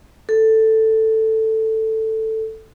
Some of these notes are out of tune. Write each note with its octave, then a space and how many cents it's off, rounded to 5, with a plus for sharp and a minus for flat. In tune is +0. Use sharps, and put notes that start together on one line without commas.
A4 +5